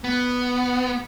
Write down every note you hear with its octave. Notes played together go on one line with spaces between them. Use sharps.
B3